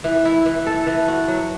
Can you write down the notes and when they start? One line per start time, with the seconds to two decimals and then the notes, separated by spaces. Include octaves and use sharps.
0.04 E3
0.25 E4
0.46 E3
0.67 A4
0.87 E3
1.08 F#4
1.28 F#3